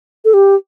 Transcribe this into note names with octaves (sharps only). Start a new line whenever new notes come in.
A4
G4